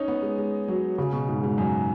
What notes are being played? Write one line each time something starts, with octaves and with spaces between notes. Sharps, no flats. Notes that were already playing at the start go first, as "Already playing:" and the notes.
Already playing: C#4 D#4
B3
G#3
G#3
F#3
C#3
B2
G#2
G#2
F#2